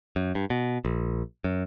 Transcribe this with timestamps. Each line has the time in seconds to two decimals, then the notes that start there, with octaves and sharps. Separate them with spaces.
0.16 F#2
0.35 G2
0.50 B2
0.85 A#1
1.44 F#2